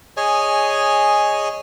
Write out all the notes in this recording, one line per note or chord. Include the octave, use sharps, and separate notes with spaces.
G#4 C#5 D#5 G#5